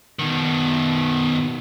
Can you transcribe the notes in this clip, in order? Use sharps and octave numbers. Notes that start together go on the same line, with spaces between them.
B2 D#3